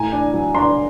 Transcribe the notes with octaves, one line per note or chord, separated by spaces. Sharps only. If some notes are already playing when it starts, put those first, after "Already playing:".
Already playing: A2 G#5 A#5
D4
F#3
D4 A#5 C6